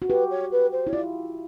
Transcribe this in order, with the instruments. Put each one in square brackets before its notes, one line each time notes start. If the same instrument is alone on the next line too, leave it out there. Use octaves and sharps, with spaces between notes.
[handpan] F#4
[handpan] G4 [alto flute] B4
[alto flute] C#5
B4
C5
[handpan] E4 [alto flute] C#5
[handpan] F4 [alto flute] D5